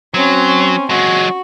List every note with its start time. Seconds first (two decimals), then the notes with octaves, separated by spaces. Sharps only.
0.14 F#3 C4 C#4
0.90 F#3 G#3 F#4